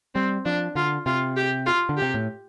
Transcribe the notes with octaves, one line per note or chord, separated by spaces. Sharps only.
G3 C4
F3 D4
D3 F4
C3 F4
G4
F4
D3
G4
C3
A2